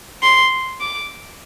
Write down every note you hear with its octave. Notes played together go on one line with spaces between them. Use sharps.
C6
D6